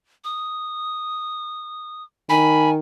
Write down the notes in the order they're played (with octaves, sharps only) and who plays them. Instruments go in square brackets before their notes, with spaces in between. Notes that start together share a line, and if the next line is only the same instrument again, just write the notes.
[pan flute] D#6
[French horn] D#3 [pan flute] G#5 [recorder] B5